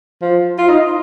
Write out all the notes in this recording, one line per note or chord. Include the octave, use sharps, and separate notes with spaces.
F3
F4
D#4